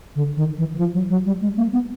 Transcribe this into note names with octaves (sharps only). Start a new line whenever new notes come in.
D3
D#3
E3
E3
F3
F#3
F#3
G3
G#3
A#3
B3